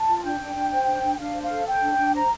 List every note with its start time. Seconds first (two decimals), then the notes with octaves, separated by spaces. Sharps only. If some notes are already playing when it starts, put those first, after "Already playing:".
Already playing: A5
0.08 F4
0.24 D4 G5
0.40 D4
0.56 D4
0.72 C5
0.88 D4
1.03 D4
1.19 D4 F5
1.36 C5
1.43 F5
1.51 A4
1.67 C5 G5
1.83 D4
1.98 D4
2.14 C5 A#5